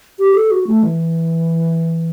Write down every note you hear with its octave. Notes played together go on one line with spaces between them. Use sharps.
G4
A4
F#4
A3
E3